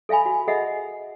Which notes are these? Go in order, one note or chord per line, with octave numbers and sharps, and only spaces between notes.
A4 E5 F5 G#5 B5
F#4
G#4 A4 D#5 E5 F#5